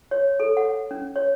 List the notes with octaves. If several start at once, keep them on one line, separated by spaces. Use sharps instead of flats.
C#5
A4
F#5
C#4
C#5